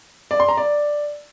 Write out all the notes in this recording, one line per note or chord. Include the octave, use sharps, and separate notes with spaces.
D5
C6
A#5
D5